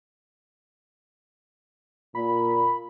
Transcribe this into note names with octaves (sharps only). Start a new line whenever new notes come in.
A#2 B5